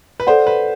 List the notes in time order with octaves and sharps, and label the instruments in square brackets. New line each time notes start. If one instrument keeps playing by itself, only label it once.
[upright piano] B4
[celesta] A4 D5 F#5 [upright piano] C5
[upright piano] B4